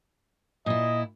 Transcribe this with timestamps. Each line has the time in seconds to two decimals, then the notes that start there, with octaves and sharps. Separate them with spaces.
0.66 A#2 E4 D#5